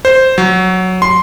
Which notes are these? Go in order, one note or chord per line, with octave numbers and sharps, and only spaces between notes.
C5
F#3
C6